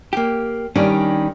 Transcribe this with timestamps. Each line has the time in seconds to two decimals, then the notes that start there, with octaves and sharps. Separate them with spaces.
0.13 A#3 G4
0.76 D#3 G3 C#4 D4